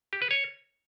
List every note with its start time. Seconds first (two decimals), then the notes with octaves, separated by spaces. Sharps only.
0.13 G4
0.22 B4
0.31 C#5